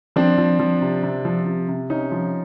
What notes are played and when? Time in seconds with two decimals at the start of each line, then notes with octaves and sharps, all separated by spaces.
0.16 F3 C4 D4
0.38 F3
0.59 F3
0.82 C3
1.03 C3
1.25 F3
1.46 C3
1.68 C3
1.90 C3 C#4 D#4
2.11 F3